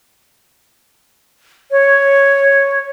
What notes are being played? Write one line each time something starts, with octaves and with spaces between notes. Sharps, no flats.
C#5